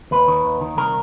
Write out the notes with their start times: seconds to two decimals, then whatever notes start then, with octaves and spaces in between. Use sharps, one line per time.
0.11 D#2 B4
0.28 D#3
0.45 D#2
0.61 D#3
0.77 C2 A#4